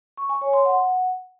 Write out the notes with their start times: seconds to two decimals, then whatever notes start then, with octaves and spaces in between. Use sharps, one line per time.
0.17 C#6
0.29 G#5
0.41 C#5
0.53 C6
0.65 F#5